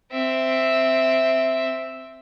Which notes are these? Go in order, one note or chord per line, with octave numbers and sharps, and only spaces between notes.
C4 E5